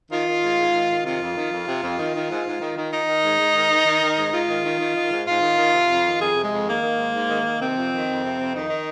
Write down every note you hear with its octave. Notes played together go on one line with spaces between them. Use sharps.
D#3 F4
D#3
G#2
G#2
D#3
D#3
C3 F4
F2
D#3
F2
C3
F2
D#3
D#3
G#2
G#2
D#3
D#3
D#3 D#4
D#3
G#2
G#2
D#3
D#3
D#3
D#3
G#2
G#2 F4
D#3
D#3
D#3
D#3
G#2
G#2 F4
D#3
D#3
C3
F2
D#3
F2 G#4
C3
G#3
F2
D#3 A#3
D#3
G#2
G#2
D#3
D#3
C3 C4
F2
D#3
F2
C3
F2
D#3 D#4
D#3